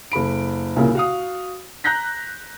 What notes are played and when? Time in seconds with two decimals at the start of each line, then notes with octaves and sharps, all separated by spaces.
0.12 F#1 A4 B5 D7
0.76 C2 A#2 C#3 A#3
0.95 F#4 F5 D#6
1.84 A#5 F#6 G6 A#6 B6